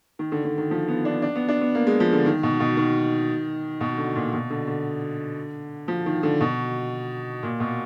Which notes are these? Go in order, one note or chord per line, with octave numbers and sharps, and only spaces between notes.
D#3
D3
D3
D#3
F3
B3
D4
D4
B3
D4
B3
A#3
G#3
F3
D3
D#3
B2
B2
D#3
B2
D3
A#2
B2
D3
D3
F3
D#3
D3
B2
A#2
B2